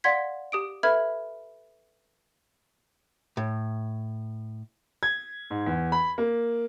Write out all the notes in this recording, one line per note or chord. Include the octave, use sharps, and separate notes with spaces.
D5 F5 F#5 C6 G#6 B6
G4 D#6 D7
A4 B4 E5 B5 F6 G#6
A2
G#6
G#2
E2
B5
A#3